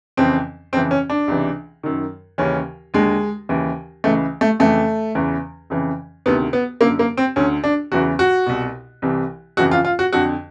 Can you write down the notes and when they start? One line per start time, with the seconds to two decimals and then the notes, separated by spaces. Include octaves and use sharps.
0.17 F2 C#3 E3 C4
0.73 F2 C#3 E3 C4
0.91 C#4
1.10 D4
1.28 C#2 C3 E3
1.83 F#2 D#3
2.38 D#2 C#3 E3 C#4
2.94 D#2 D3 G#3
3.49 D#2 C#3 E3
4.04 C#2 C#3 E3 A3
4.41 A3
4.60 F2 C#3 E3 A3
5.15 E2 C#3 E3
5.70 F2 C#3 E3
6.26 D2 C3 D#3 B3
6.53 B3
6.81 F#2 D3 A#3
6.99 A#3
7.17 C4
7.36 D2 D3 C#4
7.64 D4
7.92 E2 C#3 E3 F#4
8.19 F#4
8.46 C2 B2
9.02 C2 C3 E3
9.57 F2 C#3 E3 F#4
9.71 F4
9.85 F4
9.99 F#4
10.13 F2 D3 F#4